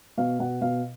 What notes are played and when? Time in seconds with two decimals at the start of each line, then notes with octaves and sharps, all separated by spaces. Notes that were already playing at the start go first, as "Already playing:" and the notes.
0.18 B2 F5
0.40 B2 F#5
0.61 B2 F5